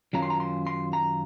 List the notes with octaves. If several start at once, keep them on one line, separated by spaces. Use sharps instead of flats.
F#2 D#3 F#3 C#4 F4 A#5
C6
A#5
C6
C6
A#5